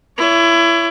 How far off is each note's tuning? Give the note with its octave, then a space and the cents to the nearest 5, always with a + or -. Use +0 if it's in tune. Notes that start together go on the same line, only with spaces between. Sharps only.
E4 +25 C#5 +30